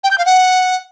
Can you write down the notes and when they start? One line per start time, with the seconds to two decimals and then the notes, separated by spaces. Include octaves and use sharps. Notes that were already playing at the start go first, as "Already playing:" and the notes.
0.04 G5
0.11 G6
0.18 F5
0.25 F#5